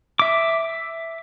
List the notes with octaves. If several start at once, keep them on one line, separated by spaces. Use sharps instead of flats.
E5 D6